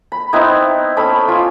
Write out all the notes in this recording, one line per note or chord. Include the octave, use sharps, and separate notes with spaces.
B5
B3 C4 D#4 E4
C#4 A4 B5
F4 G#5 B5 D6